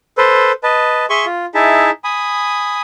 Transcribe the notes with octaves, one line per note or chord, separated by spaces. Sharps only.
A4 B4 C5
B4 D#5 A5
G#4 E5 G#5 C6 C#6
F4
D#4 E4 G#4 E5 A5
G#5 B5 D#6